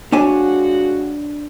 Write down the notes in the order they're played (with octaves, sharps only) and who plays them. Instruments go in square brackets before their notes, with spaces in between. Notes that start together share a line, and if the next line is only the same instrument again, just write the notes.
[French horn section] F2 G#3 F#4 [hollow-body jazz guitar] D4 C#5 G#5